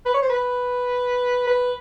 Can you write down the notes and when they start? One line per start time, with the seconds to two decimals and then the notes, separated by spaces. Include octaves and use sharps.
0.06 B4
0.14 C#5
0.22 C5
0.29 B4
1.47 B4